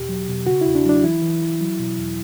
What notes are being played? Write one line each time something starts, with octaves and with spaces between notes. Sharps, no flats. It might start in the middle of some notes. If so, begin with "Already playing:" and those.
Already playing: E2 B2 G4
F#3
B2
C#3 F#4
E2 E4
D4
F#3 D4
E3 E4
E3
E3
F#3
B2
E2